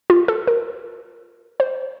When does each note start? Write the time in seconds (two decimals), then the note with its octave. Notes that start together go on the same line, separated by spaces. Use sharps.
0.10 F4
0.28 A4
0.47 A#4
1.60 C5